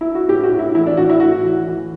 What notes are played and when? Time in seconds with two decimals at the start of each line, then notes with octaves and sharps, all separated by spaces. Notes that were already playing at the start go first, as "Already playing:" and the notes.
0.01 E4
0.15 F#4
0.28 A2 G4
0.43 F#4
0.52 A2
0.59 E4
0.75 E3 E4
0.87 D4
0.97 A2 F#4
1.10 E4
1.20 A2 F#4
1.43 E3
1.67 E3